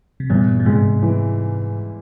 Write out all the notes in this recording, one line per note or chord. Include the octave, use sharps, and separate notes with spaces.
C3
E2 G2 A#2
A#2
G#2 C3 G#3
E3